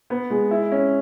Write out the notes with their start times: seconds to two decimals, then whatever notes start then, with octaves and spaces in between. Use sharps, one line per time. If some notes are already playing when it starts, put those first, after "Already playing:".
0.10 B3
0.30 G#3
0.51 E4
0.72 C#4